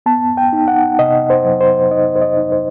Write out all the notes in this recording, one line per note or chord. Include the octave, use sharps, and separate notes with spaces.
B3 A5
G5
D#4
F#5
C3 D#5
C5
F#3
C5
D#4 D#5
C5
D#5
D#4
C5